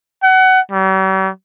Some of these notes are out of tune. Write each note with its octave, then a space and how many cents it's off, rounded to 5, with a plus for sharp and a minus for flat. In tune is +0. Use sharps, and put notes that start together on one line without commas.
F#5 +25
G3 -45